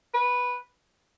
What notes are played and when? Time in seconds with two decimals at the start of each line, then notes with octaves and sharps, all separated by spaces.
0.14 B4